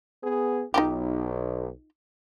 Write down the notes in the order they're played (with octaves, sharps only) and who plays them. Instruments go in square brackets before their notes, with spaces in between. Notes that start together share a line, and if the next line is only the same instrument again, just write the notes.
[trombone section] B3 G#4
[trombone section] B1 [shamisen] D#4 F4 G4